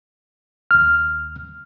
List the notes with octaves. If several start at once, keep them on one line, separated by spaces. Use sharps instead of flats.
D#2 F6